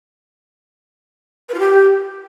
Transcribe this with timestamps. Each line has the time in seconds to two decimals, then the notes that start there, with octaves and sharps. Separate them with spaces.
1.48 B4
1.54 F4
1.59 G4